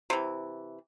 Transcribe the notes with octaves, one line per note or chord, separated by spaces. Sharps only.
C3 E3